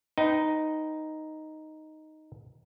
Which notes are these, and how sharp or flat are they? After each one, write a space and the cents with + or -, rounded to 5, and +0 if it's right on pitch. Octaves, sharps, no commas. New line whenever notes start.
D#4 +0 B4 +25 G5 -20